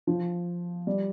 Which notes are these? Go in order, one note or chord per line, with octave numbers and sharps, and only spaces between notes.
F3
G3